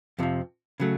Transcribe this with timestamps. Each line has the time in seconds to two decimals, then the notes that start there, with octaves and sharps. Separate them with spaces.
0.19 F2 C3 F3
0.80 C#3 F#3 A3